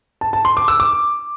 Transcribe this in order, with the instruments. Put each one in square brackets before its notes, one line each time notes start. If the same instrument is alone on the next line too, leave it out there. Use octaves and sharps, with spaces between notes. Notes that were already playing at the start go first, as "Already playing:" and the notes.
[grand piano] A5
A5
C6
D6
E6
D6